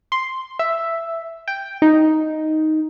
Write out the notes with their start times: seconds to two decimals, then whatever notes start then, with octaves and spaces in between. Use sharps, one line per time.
0.12 C6
0.59 E5
1.48 G5
1.82 D#4